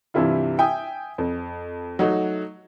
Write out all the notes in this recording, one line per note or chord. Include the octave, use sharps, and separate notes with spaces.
G2 C3 E3 G3 E4 F4
E5 G5 G#5 D#6
F2
F#3 A3 D#4 F#4